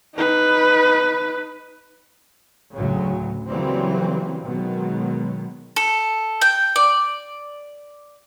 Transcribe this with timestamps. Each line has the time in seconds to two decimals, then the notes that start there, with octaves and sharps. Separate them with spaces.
0.15 D#4 B4
2.75 D2 A2 C#3 F#3
3.49 C#3 E3 F#3 G3 A#3 C4
4.44 B2 D#3 F#3 G#3
5.76 A4
6.41 G5
6.76 D5